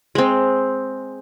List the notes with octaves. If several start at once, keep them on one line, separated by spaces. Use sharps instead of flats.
G#3 C4